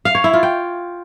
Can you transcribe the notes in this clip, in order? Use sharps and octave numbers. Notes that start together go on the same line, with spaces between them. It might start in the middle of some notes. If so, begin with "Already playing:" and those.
F5
C#5
E4
F4
G5